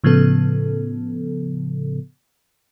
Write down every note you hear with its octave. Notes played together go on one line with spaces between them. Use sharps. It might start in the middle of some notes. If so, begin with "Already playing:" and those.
A2 C#3 F3 B3 A4